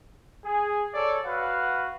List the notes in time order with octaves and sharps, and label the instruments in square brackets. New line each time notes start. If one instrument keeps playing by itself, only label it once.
[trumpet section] G#4
A4 C#5 D5
F#4 B4 F5 F#5